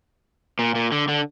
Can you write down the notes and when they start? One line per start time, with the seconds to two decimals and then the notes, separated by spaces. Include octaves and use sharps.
0.59 A#2
0.75 A#2
0.92 D3
1.08 D3